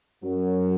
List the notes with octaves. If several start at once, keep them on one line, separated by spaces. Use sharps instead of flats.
F#2 F#3